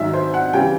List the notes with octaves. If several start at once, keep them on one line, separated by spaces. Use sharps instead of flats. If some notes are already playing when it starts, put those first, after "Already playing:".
Already playing: G#2 D#3 F#3 E5
C5
F#5
C#3 E3 G3 G5